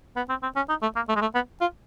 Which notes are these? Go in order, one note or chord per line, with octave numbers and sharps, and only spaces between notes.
B3
C4
C4
C#4
D#4
A3
A#3
A3
G#3
A3
B3
F4